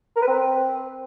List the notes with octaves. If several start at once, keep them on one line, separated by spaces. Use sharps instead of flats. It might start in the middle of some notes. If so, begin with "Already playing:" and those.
A#4
B4
C4